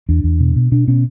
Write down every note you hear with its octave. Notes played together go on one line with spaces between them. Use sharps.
E2 D4
E2
B2
B2
B2 D4
B2 C#4